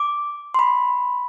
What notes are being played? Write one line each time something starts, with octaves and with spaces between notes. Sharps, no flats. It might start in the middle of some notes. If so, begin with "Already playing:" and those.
Already playing: D6
C6
B5